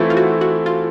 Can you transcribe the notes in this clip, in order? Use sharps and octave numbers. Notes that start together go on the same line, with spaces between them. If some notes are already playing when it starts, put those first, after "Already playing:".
Already playing: E3 A3 C4 E4 F4 A4
F4
F#4
F#4
F4